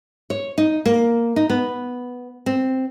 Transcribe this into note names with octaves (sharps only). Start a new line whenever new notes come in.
C#5
D#4
A#3
D#4
B3
C4